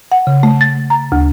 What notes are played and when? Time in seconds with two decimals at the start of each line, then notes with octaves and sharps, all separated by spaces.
0.12 F#5
0.27 C#3
0.43 A3
0.61 A6
0.90 A#5
1.12 D2